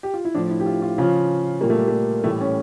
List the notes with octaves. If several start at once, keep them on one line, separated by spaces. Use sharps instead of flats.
G4
F4
E4
A2 F3 D4
E4
G4
F4
F4
C#3 F3 F4
A#2 G3 A#3
A3
G3
A3
A2 E3 G3 A3
C#4